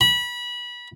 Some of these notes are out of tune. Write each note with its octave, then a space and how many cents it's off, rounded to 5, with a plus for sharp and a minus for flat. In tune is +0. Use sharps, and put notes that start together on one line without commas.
B5 -25